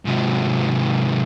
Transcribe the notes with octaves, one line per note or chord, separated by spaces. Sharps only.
G#2 C3